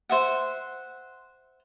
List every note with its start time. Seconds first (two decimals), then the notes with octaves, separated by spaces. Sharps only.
0.09 C5 E5 F#5